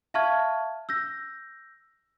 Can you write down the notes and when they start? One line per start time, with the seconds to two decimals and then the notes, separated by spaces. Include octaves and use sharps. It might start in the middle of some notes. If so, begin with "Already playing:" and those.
0.14 E5 F5 A5 C#6 F6 G#6
0.89 E6 G6 A#6